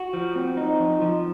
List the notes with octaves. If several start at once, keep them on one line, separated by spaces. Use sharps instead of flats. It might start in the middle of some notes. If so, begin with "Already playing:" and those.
Already playing: F#4
F3
C4
D#4
F3
F3